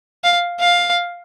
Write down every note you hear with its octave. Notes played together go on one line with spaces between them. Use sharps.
F5
F5